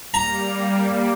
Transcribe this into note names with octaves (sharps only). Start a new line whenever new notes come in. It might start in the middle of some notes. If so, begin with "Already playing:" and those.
G3 A#3 A#5